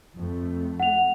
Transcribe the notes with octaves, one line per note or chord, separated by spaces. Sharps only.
F2 A3
F#5 F7